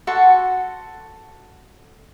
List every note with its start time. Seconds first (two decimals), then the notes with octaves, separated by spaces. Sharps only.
0.07 F#4 A4 F#5 C6